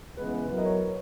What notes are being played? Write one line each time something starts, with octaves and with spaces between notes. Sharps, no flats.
C#3 E3 G#3 B3 B4
B4
F#3 B3 E4 A#4 B4
D#5
C#5